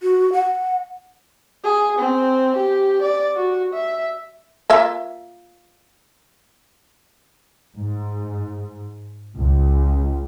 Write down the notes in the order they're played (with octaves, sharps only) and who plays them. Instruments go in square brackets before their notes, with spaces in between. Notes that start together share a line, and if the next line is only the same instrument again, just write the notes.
[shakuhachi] F#4
F#5
[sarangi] G#4
C4
G4
D5
F#4
E5
[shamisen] A#3 F4 E5
[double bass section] G#2
C#2